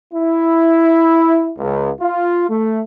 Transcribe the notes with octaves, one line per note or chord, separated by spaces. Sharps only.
E4
C#2
F4
A3